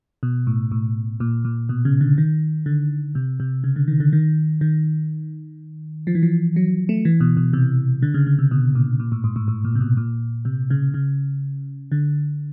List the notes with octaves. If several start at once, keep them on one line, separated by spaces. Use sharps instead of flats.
B2
A2
A2
A#2
A#2
B2
C#3
D3
D#3
D3
C3
C3
C#3
D3
D#3
D3
D#3
D#3
F3
E3
F3
F#3
A3
E3
B2
B2
C3
D3
C#3
C#3
C3
B2
A#2
A#2
A2
G#2
A2
A2
A#2
C3
B2
A#2
C3
C#3
C#3
D3